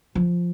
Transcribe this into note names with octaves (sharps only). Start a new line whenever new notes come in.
F3